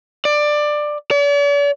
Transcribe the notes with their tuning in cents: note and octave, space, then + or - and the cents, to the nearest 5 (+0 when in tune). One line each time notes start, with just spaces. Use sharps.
D5 +15
D5 -45